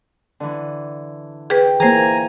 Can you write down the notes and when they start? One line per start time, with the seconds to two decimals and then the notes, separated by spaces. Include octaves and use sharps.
0.40 D3 E3
1.50 G#4 B4 G5
1.80 E3 A#3 G#4 C5 G#5 A#5